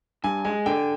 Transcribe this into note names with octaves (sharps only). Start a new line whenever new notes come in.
G2 G#5
G#3 G#5
D3 G5